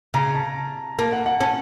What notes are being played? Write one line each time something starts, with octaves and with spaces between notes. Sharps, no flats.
C#3 A#5
A5
A#3 A5
F#5
F#5
C#4 A5